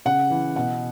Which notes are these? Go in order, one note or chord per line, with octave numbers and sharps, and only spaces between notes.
C#3 F#5
E3
B2 F#5